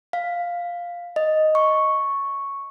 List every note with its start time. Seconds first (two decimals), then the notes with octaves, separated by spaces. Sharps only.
0.13 F5
1.16 D#5
1.55 C#6